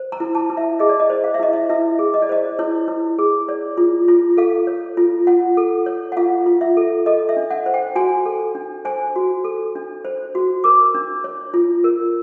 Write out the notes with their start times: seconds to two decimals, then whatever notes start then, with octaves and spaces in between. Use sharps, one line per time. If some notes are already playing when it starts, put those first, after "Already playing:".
Already playing: C5
0.12 A#5
0.20 E4
0.35 A5
0.50 E4
0.57 E5
0.79 G#4 D#5
0.89 D5
1.00 D#5
1.10 C5
1.24 F5
1.34 E5
1.39 E4 D#5
1.53 E5
1.69 E4 E5
1.99 G#4
2.14 D#5
2.22 D5
2.29 C5 D#5
2.59 E4 C#5
2.88 E4
3.19 G#4
3.48 C#5 D5
3.77 F4
4.08 F4
4.37 A4 F5
4.67 C#5
4.97 F4
5.27 F4 F#5
5.57 A4
5.86 C#5
6.12 F#5
6.17 F4 F5
6.46 F4
6.61 E5
6.77 A4
7.06 A4 D#5
7.29 E5
7.37 D4
7.50 F#5
7.66 C5
7.74 G5
7.95 F#4 G#5
8.26 A4
8.55 D4
8.85 C5 G#5
9.16 F#4
9.44 A4
9.75 D4
10.05 C5
10.35 F#4
10.64 A#4 D6
10.95 D4
11.24 C#5
11.54 F4
11.84 A#4